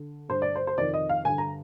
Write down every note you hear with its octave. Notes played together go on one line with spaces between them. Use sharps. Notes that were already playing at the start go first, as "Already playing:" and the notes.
Already playing: D3
G2 D3 C5
D5
C5
C5
F2 C3 D#3 D5
D#5
F5
G2 D3 G#5
A#5